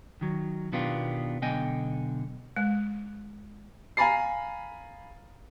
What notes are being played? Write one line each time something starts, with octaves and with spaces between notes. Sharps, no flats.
D#3 F#3
B2 D#3 B3 D4 F4 G4
B1 D3 B3 D#5 G5 G#5
G#3
F5 G#5 A#5 B5 A6 C7